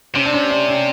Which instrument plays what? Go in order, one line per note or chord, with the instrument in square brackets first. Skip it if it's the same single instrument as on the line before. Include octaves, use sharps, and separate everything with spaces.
[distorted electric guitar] C3 [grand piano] C#4
[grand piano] D4
C#4
D4
C#4